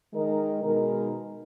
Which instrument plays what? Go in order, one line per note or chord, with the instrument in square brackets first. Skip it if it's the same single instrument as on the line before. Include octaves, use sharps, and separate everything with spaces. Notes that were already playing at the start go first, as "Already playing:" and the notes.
[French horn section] D#3 G#3 D#4 A#4 D#5
B2 G#3 D#4 A#4